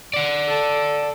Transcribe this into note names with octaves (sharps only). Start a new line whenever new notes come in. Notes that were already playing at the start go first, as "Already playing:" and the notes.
D5 F#5
A4